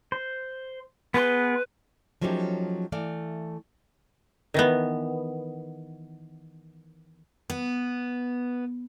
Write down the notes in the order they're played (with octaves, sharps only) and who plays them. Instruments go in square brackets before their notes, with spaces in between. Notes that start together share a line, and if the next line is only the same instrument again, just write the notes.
[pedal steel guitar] C5
[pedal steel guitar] B3 G#4 C6 [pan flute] B4
[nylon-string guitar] F3 F#3 A3 C#4 D#4 G4
E3 A3 D5 F5
[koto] D#3 E3 B3
[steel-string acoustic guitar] B3